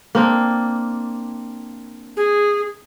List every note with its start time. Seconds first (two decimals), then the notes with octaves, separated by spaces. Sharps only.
0.15 A#3 C4 D4
2.17 G#4